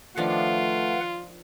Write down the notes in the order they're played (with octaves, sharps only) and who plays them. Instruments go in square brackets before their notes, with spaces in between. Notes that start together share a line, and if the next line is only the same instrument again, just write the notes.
[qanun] D#3 F3 D4 [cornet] A3 [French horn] F4 [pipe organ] B4 F5 F#5